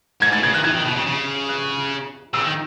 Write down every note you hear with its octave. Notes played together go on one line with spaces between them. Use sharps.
G#2 G#6
A2 A6
C#3 G#6
D#3 F#6
E3 G#6
D#3
B2
C#3
C#3
F#6
C#3 E6
D#3